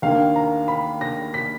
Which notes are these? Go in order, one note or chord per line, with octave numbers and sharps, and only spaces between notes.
D#2 D#3 A#3 D4 F5
A#5
B5
A#6
B6